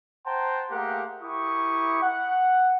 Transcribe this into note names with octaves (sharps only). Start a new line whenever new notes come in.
C5 F#5 G5 A5 A#5 C6
A3 A#3 G4 G#4 A#4 F#5
E4 G4 A#4 C#6 D#6
F#5